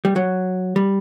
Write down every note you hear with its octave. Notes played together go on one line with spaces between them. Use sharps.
G3
F#3
G3